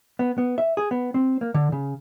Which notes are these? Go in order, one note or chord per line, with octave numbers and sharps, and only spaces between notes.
B3
B3
E5
G#4
B3
C4
A#3
D3
C#3